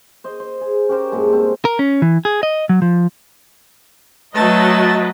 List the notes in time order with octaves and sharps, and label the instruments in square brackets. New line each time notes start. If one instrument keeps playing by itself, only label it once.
[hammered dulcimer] C5 D#5
C5
G#4
C#4 G4 A#4 C5
G2 A#2 D3 G#3
C4
[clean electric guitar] A#4
C#4
E3
G#4
D#5
F#3
F3
[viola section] F#3 B4 D#5 [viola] A3 A5